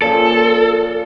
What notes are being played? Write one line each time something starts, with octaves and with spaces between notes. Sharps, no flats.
A#2 C#3 F3 A4